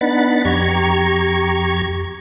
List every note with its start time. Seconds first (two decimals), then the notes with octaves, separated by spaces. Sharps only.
0.01 B3 D4 D#4 F#5 B5 A6
0.45 F2 G4 A#5 C#6 G#6